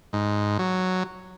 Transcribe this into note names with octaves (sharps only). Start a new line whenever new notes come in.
G#2
F#3